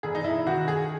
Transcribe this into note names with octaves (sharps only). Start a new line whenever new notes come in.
E1 G#4
D#4
E4
D#3 F#4
G#4